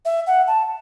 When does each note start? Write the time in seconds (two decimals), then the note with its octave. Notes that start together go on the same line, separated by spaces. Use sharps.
0.05 E5
0.27 F#5
0.47 A5